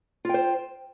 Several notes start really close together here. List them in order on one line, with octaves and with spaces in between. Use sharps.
F4 G5 C5